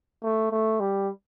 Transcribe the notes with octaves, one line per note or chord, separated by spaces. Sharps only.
A3
A3
G3